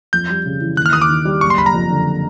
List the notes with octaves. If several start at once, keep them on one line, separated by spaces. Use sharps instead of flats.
F2 G6
G3
C#3
E3
D#2 F#6
F6
D#2 D#6
D6
D#3
G3
F#1 C#6
C6
F#1 B5
A#5
F2
D3